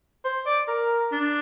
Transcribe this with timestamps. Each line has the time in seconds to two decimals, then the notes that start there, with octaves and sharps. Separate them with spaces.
0.25 C5
0.46 D5
0.68 A#4
1.11 D4